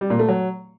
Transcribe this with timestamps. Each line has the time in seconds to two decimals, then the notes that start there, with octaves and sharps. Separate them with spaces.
0.01 G3
0.10 A#2
0.19 A3
0.28 F#3